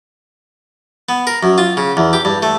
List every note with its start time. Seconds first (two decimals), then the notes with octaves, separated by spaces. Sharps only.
1.09 B3
1.27 A#4
1.43 F#2
1.58 F4
1.77 C#3
1.97 E2
2.13 G4
2.25 G2
2.43 A3